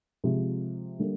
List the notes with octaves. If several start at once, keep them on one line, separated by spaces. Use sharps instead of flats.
C3 F3 G#3
D3 G3 A#3